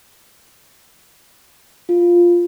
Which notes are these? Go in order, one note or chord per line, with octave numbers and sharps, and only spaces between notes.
F4